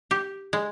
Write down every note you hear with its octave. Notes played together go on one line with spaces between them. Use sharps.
G4
G#3